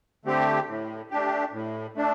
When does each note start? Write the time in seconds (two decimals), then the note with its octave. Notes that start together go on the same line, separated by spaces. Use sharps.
0.25 D3 A3 C4 G4
0.68 A2
1.11 A3 D4 G4
1.53 A2
1.96 A3 D4